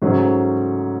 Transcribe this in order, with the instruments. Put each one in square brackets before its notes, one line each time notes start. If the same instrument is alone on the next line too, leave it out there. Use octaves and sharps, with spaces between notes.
[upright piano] G#2 F#3 A3 C#4